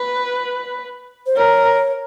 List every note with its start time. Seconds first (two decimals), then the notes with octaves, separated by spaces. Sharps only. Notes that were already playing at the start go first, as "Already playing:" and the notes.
Already playing: B4
1.26 C5
1.37 A#4 C#5